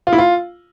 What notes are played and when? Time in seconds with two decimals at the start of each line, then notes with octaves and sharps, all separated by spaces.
0.07 F4
0.13 E4
0.18 F4